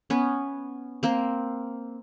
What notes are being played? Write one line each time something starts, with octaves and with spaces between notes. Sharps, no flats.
B3 C#4
A#3 C4